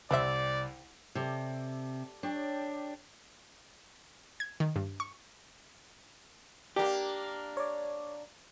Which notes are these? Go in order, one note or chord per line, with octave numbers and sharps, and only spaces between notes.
C2 G3 C5 D5 E5
C3 A4 D5
D4 G4 C#5
G#6
D#3
G2
C#6
A#3 D4 G4
C#5 D5